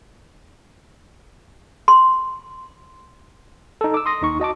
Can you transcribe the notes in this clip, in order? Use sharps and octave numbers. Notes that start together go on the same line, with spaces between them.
C6
D#4 A4
D6 E6
C6 D#6 A#6
D#2 D#4 C#6
F#4 D#5 A5 D6